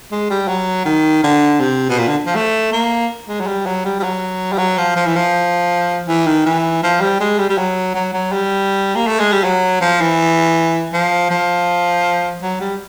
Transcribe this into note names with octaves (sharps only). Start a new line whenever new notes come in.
G#3
G3
F#3
D#3
D3
C3
B2
A#2
D3
F3
A3
A#3
G#3
F#3
G3
F#3
G3
G3
F#3
G3
F#3
F3
F3
E3
F3
E3
D#3
E3
F3
G3
G#3
G3
G3
F#3
F#3
F#3
G3
A#3
A3
G#3
G3
F#3
F3
E3
F3
F3
F#3
G3